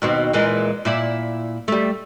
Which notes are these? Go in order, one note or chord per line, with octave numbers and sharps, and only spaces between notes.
D#2 B2 C4
A#2 E3 G#3
A#2 E4 D5
G3 A3